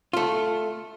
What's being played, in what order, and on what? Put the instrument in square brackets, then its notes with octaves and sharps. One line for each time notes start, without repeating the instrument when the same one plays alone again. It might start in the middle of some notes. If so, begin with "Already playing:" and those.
[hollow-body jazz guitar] A3 F4